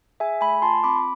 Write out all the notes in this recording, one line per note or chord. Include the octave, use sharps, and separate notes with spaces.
G#4 E5 G#5
A3 G#5 B5
F4 A5 C6
C4 B5 D6